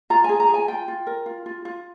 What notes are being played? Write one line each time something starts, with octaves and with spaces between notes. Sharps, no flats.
F4 A#5
G#4 G#5
A#5
G#4
G#5
F4 G5
F4
A#4
F4
F4
F4